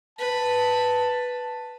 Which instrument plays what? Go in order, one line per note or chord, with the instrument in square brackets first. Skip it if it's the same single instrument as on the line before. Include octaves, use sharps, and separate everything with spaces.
[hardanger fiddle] B4 [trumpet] A5